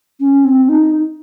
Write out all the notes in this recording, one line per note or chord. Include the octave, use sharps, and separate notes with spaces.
C#4
C4
D#4